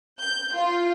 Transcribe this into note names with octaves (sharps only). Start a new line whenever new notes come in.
G6
F4